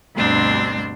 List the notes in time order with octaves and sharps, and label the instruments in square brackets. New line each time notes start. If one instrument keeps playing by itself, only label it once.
[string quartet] D2 G2 B2 C4 D4 C6